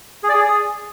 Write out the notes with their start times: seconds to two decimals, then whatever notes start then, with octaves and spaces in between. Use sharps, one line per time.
0.23 G#4
0.29 D5
0.35 G#4